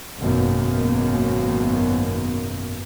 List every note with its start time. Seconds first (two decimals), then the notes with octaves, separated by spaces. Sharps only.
0.18 G#1 F#2 B2 D#3 A#3 B3